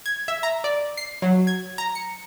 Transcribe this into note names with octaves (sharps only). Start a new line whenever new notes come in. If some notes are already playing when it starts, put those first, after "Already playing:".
G#6
E5
A#5
D5
C7
F#3
G#6
A#5
C#7